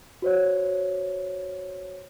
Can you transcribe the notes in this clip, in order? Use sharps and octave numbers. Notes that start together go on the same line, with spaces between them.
F#4 C5 C#5